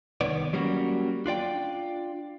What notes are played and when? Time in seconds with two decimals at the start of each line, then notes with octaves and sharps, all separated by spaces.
0.21 C2 D#3 B3 C#5 D5
0.53 F#3 G3 A#3 C#4 F#4
1.26 D4 F4 D5 G5